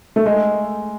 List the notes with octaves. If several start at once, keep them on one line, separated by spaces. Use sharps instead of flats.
A3
G#3